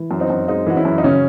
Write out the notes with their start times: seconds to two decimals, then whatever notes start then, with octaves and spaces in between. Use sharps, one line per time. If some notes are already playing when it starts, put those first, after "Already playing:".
Already playing: E3
0.11 F#2
0.20 C4 D#4
0.30 F#2
0.48 G#3 C4 D#4
0.66 E3 F#4
0.76 C#4 E4
0.85 F#2
0.98 D#4
1.04 C#3 C#4